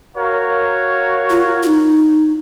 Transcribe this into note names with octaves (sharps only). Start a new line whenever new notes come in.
F#4 A#4 C#5 F5
F4
F4
D#4